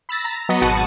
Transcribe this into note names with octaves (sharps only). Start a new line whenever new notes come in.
B5 E6 A6 A#6
A#5
F#3 B3 D#5
G#1 B2 F#5 A5 C#6 D#7